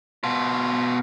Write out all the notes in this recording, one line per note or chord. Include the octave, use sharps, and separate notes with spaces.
B2 F4